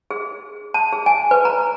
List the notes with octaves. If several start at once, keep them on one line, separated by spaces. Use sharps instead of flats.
G#4
A5
G#4
G#5
B4
A#5